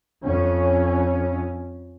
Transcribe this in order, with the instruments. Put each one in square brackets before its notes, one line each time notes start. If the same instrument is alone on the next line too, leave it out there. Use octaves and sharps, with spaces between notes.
[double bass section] F2 C#4